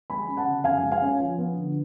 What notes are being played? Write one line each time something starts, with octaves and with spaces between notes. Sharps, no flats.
G#3 G#5 B5
C#4
F#5 A5
C#3
F#2 F5 G#5
G#3
F5 G#5
C#4
F3
B3
D3